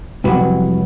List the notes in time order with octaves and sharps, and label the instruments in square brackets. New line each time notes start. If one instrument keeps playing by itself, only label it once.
[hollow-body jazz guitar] C2 F2 F#3 B3